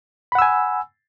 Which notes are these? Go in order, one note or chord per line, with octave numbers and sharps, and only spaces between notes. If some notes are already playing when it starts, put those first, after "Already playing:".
F#5 G#5 B5 E6